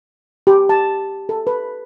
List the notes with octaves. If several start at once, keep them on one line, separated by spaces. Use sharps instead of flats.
G4
A5
A4
B4